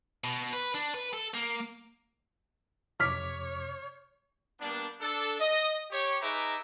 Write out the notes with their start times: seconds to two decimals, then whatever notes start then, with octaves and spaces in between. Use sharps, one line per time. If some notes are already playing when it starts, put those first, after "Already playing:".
0.24 B2
0.53 B4
0.74 D4
0.94 B4
1.13 A4
1.34 A#3
3.00 F2 C3 C#5 D6 F6 B6
4.60 G3 A#3 B3 D4
5.00 D4 A4
5.40 D#5
5.91 G4 C#5
6.22 D#4 G#4 B4 E5 A#5 D6